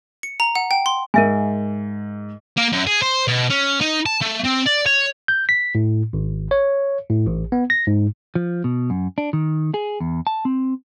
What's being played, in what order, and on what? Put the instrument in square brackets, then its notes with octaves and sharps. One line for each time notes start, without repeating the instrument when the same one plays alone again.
[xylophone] C#7
A#5
F#5
G5
C6
[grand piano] G#2 [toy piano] A#4 E5 G#5
[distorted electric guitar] A#3
F#2
G#4
C5
B2
C#4
D#4
A5
A3
C4
D5
C#5
[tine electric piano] G6
B6
A2
G#1
C#5
A2
A1
B3
A#6
G#2
[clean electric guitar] F3
B2
F#2
D4
D#3
G#4
E2
A5
C4